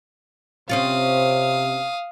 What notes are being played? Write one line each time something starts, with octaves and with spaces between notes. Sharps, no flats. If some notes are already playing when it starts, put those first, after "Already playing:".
C3 C4 C#4 F4 F5 D#6